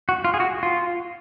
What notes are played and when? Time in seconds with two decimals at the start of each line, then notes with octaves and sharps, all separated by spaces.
0.09 F#4
0.25 F4
0.34 G#4
0.40 F#4
0.63 F4